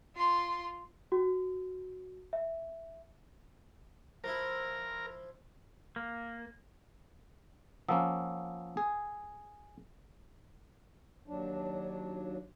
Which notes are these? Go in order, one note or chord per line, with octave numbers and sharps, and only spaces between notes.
F4 C6
F#4
E5
F3 E4 A#4
A#3
F3 A#3 C#4 F#5 D#6 E6
G#4
D#2 F#3 D4